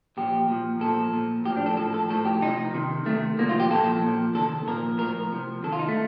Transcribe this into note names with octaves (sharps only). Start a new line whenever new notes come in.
A#2 F3 G4
A#2 F3
A#2 F3 A4
A#2 F3
A2 F3 G4
D4
A4
A2 F3 A4
A4
A2 F3 A4
G4
C3 F3 D#4
C3 D#3
C3 D#3 A3
C3 F3 A#3
F4
G4
A#2 F3 A4
A#2 F3
C3 D#3 A4
A#2 F3 A#4
A2 F3 A#4
C3 F3
C3 D#3 A4
F4
D#4
A3